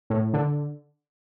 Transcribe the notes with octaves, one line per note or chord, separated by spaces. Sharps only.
A2
D3